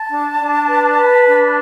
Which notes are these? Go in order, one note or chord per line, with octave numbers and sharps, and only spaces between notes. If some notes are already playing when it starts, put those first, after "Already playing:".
Already playing: A5
D4
D4
B4
B4
D4